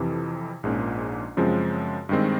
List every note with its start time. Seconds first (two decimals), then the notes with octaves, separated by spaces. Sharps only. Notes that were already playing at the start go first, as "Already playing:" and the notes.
Already playing: F2 C3 E3
0.63 A#1 G#2 F3 A#3 C#4
1.37 F#2 C#3 F3 G#3 C4
2.09 G2 D#3 G#3 C4